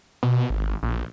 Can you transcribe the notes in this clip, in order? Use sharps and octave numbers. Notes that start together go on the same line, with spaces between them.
B2
G#1
A#1